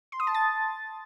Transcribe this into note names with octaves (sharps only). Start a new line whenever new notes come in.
C6
D#6
A5
A6